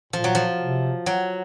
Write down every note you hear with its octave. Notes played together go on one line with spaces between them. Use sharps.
A#2 F3
F#3
F3
C3
F#3